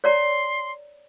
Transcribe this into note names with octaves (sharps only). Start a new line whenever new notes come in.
C#5 D5 A#5 C6